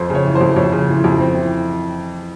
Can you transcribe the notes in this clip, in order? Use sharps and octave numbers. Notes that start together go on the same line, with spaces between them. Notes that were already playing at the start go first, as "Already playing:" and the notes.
Already playing: F2 C5
C#3 C#5
E3
C5
F2
F2 C#5
C#3
E3
F2
C4
E3